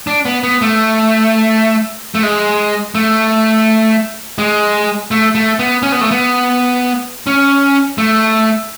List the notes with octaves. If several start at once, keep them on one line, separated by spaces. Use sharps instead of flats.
D4
B3
B3
A3
A3
G#3
A3
G#3
A3
A3
B3
C#4
B3
A3
B3
C#4
A3